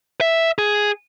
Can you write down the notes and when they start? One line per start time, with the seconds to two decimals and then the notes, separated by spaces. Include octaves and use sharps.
0.21 E5
0.58 G#4